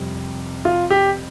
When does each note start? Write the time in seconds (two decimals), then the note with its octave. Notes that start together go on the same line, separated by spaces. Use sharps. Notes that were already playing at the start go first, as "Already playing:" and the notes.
Already playing: F2 C3 G3
0.65 F4
0.91 G4